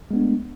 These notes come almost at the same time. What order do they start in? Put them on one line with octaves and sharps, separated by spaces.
G#3 B3 D4 A3